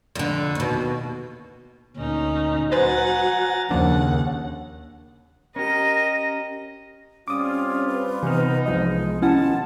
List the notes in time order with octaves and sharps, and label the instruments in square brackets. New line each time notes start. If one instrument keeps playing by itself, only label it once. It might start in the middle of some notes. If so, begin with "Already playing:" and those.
[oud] F2 D3
D#2 B2
[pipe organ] D2 A#2 [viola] C#4 D#4
[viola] F#3 F#5 [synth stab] B4 C5 [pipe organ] G#5 A#5 A6
[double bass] D#2 [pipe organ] C#3 [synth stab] F3 A#3 D4 [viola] F#5
[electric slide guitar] C#4 G4 [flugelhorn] A#4 [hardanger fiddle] D#5 [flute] A#6
[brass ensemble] G3 C4 F4 [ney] C#4 [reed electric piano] D6 D#6
[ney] B4
[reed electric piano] C3 F6 [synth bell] E3 [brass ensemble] B3 D#4
[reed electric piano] C2 F3 D#5 [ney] G#3
[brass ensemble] D#2 B2 A5 [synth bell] C#4 E4 F#5 [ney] F4